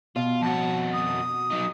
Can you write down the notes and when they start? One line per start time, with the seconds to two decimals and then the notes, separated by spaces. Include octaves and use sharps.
0.16 B2 F4
0.42 F2 F#4 A5
0.93 D#6
1.51 F#3 D#4